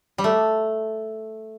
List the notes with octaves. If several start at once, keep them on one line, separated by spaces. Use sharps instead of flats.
G3
A3